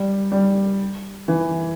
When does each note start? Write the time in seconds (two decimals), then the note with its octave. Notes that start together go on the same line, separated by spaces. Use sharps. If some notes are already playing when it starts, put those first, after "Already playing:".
Already playing: G3
0.32 G3
1.28 E3